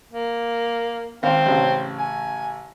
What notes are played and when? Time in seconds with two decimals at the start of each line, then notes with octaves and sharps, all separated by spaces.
0.12 A#3
1.23 G#1 C4 F5
1.46 A1 C#3
1.99 G#5